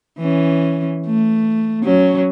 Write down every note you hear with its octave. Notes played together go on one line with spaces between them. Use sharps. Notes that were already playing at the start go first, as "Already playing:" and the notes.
E3 C#4
A3
F#3 C#4